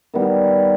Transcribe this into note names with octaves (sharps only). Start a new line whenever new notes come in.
D#3 G3 B3